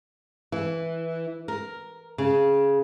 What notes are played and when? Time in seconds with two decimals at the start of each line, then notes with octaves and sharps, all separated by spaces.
0.52 E3
1.48 A#4
2.18 C#3